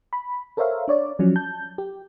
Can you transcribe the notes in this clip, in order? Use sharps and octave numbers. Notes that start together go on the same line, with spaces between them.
B5
A4 A#4 C5 C#5 E5 F5
D4 C#5 D5
F3 F#3 C#4
A5 G6
G4